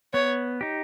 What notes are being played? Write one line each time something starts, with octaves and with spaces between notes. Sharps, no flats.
B3 C#5
D#4 G4